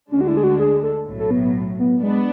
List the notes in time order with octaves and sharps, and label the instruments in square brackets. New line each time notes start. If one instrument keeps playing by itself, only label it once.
[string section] D2 D3 G#3 D4 [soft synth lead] C#4
[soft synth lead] F#4
E4
G#4
F#4
G#4
A4
[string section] B1 A2 F#3
[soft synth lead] A4
B3
B3
B3
[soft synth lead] G#3 [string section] B3 D4